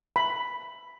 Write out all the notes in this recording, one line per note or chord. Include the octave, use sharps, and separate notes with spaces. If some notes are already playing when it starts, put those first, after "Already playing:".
B5